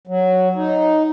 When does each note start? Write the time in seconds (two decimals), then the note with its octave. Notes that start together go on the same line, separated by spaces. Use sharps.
0.07 F#3
0.55 D#4